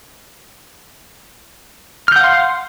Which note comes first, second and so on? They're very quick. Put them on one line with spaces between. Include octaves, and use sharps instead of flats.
F6 G6 F#5 F5 C6